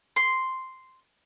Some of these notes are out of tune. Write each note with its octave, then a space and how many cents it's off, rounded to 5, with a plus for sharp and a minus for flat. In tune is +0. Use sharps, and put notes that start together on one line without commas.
C6 -5